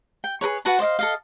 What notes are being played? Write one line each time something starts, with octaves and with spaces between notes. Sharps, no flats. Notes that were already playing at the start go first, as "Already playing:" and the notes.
G5
G#4 A#4 B4 C#5
F#4 B4 F#5 A5
C5 D5 D#5 F5
A4 D#5 F5